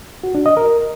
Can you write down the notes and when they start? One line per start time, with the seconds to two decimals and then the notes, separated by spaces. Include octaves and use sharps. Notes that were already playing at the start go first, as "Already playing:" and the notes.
0.24 F#4
0.35 D4
0.46 D#5
0.57 A#4